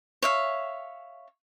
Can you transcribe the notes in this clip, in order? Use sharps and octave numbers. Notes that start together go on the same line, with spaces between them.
C#5 E5 F5